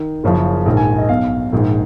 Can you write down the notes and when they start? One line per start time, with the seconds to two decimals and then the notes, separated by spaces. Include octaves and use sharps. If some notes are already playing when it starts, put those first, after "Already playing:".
Already playing: D#3
0.24 F#1 F#2 C#3 F3
0.66 A#1 G#2 D#3
0.77 G#5
0.98 D#5
1.09 B1 B2 F5
1.52 A#1 G#2 D#3